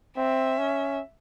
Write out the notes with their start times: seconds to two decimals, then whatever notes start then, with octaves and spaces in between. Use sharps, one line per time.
0.17 C4 E5
0.58 C#4